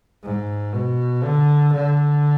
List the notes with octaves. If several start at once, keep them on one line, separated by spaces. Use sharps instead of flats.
G#2
B2
D3
D3